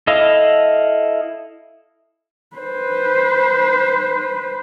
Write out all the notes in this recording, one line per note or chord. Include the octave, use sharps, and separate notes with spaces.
E4 A4 D#5 F5
B4 C5